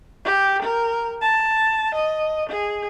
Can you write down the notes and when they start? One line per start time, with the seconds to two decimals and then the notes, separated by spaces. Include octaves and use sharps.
0.25 G4
0.62 A#4
1.21 A5
1.94 D#5
2.49 G#4